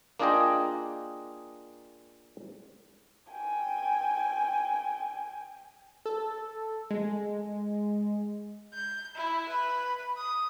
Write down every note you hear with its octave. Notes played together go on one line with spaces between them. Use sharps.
A#3 D4 F4 G#4 D#5 G5
G5 G#5
A4
G#3
G6
E4
B4
D#6